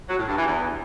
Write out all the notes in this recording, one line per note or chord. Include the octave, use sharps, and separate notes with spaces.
F#3
A2
G2
E3
E2